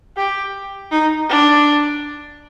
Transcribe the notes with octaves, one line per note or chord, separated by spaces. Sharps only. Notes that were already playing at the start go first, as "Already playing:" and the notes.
G4
D#4
D4